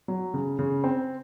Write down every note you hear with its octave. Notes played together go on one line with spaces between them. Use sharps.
F#3
C#3
C#3
C4